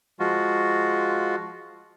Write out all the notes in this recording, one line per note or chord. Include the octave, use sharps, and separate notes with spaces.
F3 G#3 F4 F#4